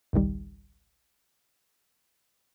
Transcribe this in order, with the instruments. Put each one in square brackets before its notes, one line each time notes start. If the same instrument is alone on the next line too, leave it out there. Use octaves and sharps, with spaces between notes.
[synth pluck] G#1 C#2 D#3 G3